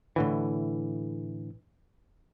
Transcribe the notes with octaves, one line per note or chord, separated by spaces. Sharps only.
A2 D3 E3